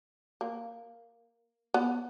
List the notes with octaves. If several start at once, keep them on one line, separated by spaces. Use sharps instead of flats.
A#3
B3